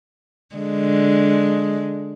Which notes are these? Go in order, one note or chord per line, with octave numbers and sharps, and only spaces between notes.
D3 G#3